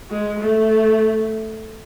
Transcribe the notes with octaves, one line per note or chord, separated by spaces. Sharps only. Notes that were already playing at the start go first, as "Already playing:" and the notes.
G#3
A3